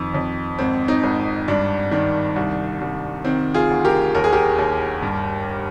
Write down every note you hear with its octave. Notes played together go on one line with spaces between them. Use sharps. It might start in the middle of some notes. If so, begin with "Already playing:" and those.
Already playing: F2 D#3
F2
G#1 C4
C4 D#4
G#1
G2 D4
D#3 D4
C2
C2
D#3 C4
F4 G#4
D2
G4 A#4
D#2 A#4
G#4
G4 A#4
D#2
G2